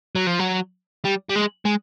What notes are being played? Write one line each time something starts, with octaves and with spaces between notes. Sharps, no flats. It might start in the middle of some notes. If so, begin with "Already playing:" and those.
F#3
F3
F#3
G3
G3
G#3
G#3